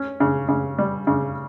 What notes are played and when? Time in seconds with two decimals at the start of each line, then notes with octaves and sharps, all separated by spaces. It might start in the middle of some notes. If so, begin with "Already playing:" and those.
Already playing: C#4
0.20 C#3
0.49 C#3
0.79 G3
1.07 C#3